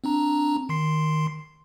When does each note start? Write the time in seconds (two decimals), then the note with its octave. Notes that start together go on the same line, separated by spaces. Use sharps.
0.04 C4 D4 A#5
0.69 D#3 C6 C7